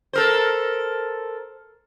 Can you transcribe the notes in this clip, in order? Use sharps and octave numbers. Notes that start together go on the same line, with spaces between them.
A4 A#4 C5